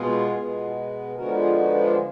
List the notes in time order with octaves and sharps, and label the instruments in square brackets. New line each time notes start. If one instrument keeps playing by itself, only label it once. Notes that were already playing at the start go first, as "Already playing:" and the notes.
Already playing: [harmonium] B2 G#3 B3 F4 G#4
B2 G#3 B3
D3 F3 G#3 B3 F#4 A#4
F4 G#4
D#4 F#4
D#4
D4 F4